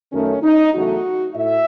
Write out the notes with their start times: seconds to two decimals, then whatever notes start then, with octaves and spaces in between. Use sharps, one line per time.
0.12 F#2 D#3 A3 C#4
0.42 D#4
0.73 E2 C#3 F#3 A3 F#4
1.35 A2 E5